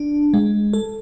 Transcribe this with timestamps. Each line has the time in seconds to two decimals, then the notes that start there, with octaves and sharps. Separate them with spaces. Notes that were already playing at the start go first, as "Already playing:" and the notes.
Already playing: D4
0.34 G#3
0.73 A4